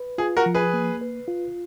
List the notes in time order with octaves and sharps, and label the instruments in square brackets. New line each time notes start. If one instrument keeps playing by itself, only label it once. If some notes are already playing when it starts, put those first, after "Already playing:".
Already playing: [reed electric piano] B4
[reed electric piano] F4 [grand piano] G#4
[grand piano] F#4 A#4
[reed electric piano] F3
[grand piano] G#4 B4
[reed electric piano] A#3
B4
F4